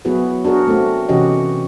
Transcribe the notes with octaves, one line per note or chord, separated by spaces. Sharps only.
F#3 B3 E4 F#4 G#4 B4
D4 F#4 G#4 A#4
A3 C4 F#4
C3 E3 C#4 F#4 G4 D#5